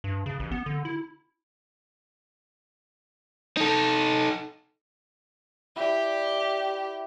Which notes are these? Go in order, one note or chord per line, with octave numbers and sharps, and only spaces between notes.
G2
C#3
A1
B3
D3
E4
D#4 A4
E4 G4 D5